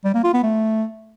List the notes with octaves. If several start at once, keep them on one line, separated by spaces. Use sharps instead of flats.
G3
A#3
F4
B3
A3